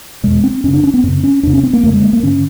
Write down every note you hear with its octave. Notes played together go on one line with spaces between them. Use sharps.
E2 B2 G#3
C4
F#2 C#3 C#4
D4
C#4
B3
F#2 C#3 C4
C#4
E2 C3 D4
C#4
C4
A#3
F#2 D3 A3
G#3
A#3
A#3
G2 D3 C#4